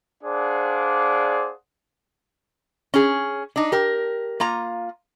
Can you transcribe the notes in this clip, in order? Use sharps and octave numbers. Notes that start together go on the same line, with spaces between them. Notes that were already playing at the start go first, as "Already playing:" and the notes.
D4 G#4 C5 D5 F5 F#5
C#4 G#4
D4 D#4
G4 A#4
A#3 F4 A#5